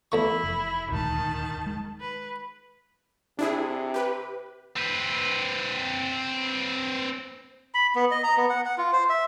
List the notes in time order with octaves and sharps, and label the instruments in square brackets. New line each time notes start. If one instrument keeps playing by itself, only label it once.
[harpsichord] E2 A3 C#6 [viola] E4
[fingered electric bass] F1
[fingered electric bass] D#1 D2 G#2 [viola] D#3 A5
[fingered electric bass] G#3
[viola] B4
[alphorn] C3 [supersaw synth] D4 E4 G#4
[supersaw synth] G4 B4
[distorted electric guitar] C4 B4
[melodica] B5
B3
D#5
A#5
B3
F#5
F#5
F4
C5
E5